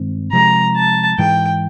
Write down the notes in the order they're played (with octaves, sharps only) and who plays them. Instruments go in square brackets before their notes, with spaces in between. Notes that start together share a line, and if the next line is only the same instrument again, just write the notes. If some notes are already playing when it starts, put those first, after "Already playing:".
Already playing: [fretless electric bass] G2 D#3 G#3 C4
[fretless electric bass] C3 F3 G#3 [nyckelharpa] A#5
[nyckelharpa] A5
[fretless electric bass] G#2 E3 G#3 [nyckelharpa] G5